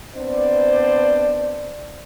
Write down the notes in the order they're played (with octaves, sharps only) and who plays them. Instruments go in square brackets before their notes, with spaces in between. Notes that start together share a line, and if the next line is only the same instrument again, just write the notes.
[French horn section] B3 C4 D4 C5 D5